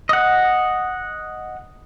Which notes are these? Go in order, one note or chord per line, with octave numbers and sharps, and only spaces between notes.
D#5 F#5